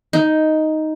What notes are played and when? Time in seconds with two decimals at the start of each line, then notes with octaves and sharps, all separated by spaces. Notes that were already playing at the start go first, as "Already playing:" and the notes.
0.13 D#4